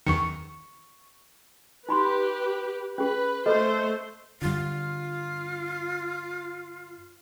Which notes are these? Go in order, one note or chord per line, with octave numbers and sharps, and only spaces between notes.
E2 D#3 C#6 C#7
D#4 G4 B4 B5 C6
C#4 G#4 B4
A3 A4 B4 C5 D#5
G2 D3 F4